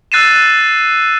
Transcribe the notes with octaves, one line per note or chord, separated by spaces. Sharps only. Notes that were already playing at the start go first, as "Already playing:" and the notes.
E6 F#6 A6 C7 D#7 E7